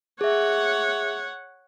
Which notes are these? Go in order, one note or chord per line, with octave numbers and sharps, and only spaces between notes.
G#4 C#5 E5 F#5